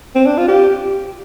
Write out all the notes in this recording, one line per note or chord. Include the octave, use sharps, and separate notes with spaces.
C4
D4
F4
G4